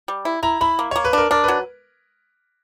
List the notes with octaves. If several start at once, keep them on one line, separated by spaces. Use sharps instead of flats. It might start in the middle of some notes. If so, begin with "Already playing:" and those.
G3
E4
E4 A#5
E4 B5
A#3
A#3 C#5
B4
D4 A#4
D4 A#4
F#3 B4